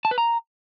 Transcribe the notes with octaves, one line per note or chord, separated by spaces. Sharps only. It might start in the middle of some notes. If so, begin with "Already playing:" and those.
A5
B4
A#5